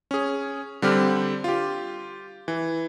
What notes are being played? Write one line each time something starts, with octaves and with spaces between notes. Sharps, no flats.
C#4 G#4
D3 G3 C4 G4 F6
F4 G4
E3